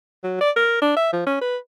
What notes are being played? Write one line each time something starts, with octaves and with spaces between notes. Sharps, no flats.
F#3
D5
A#4
D4
E5
F3
C#4
B4